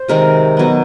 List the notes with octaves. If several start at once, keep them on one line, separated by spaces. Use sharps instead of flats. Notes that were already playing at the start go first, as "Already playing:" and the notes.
Already playing: C5
C3 D#3 G#3 A#4
B2 F#3 B3